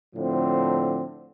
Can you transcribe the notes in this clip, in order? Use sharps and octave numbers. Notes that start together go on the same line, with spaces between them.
A2 D3 F3 C4